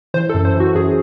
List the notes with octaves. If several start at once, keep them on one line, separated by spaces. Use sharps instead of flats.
E3 C5
A4
F#2
C5
E3
F#4
F#2 G#4